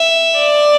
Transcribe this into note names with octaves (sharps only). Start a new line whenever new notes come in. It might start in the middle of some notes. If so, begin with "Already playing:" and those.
Already playing: E5
D5